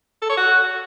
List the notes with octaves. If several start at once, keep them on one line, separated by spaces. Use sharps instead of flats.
A4
C#5
F#4